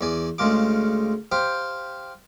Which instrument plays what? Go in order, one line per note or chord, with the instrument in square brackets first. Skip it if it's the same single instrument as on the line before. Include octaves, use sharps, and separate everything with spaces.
[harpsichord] E2 D5 G#5
D2 C#3 G#3 F4 D6
G4 C5 F5 G5